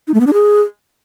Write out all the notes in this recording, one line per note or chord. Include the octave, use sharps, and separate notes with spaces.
D#4
A3
B3
D4
G#4